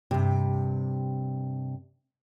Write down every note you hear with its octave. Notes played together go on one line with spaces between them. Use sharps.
G2 C3